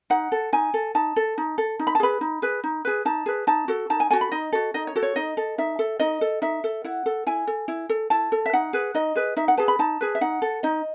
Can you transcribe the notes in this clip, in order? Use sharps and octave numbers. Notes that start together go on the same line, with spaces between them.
D#4 F#5
A4
D#4 G#5
A4
D#4 A5
A4
D#4
A4
D#4
B5
A5
G#4 B4 B5
D#4
G#4 B4
D#4
G#4 B4
D#4 A5
G#4 B4
D#4 A5
F#4 A4
D#4 A5
G#5
F#4 A4 G#5
B5
D#4 D#5
F#4 A4
D#4 D#5
C#5
F#4 A4
C#5
D#4 D#5
A4
D#4 E5
A4
D#4 D#5
A4
D#4 E5
A4
E4 F#5
A4
E4 G#5
A4
E4
A4
E4 A5
A4
E5
D#4 F#5
G#4 B4
D#4 D#5
G#4 B4
D#4 E5
F#5
G#4 B4 A5
B5
D#4 A5
G#4 B4
E5
D#4 F#5
A4
D#4 D#5